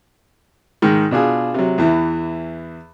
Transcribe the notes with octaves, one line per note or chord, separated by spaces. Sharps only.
G#2 D#3
B2 D4 F4 G#4
C3 F#3
E2 E3